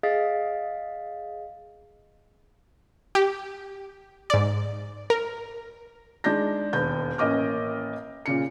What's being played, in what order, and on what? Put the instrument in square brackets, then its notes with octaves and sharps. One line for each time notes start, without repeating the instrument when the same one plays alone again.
[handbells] G#4 D#5 F5 A6 B6
[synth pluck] G4
G#2 D5
A#4
[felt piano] G#3 D4 D#4 G6 A#6
E1 D#2 G6
A1 A#3 C#4 D#5 D6 F6
A#2 C#3 C#7